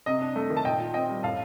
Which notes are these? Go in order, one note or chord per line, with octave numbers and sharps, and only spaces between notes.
C3 D#5
D4
A3
D#3
A5
A#2 D#5 G5
F4
C4 D#5 G5
G3
A2 F5 A5